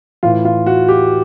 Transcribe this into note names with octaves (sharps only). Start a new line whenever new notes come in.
A2 E3 F4
F4
F#4
G4